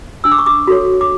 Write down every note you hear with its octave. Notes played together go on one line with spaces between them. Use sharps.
D4 E6
D6
C#6
D6
F#4 A4 C#5
D6